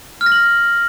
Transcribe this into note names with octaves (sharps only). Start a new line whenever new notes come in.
F6
A#6
F#7